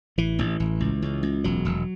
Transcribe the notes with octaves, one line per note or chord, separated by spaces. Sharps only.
A1 E3
A1
A1
C#2
C#2
C#2
E1 F#3
E1